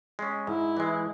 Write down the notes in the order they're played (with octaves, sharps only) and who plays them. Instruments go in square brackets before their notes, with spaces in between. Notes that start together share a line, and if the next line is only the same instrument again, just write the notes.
[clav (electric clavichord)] G#3 C#4
[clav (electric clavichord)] G#2 [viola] E4
[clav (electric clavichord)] E3 G#3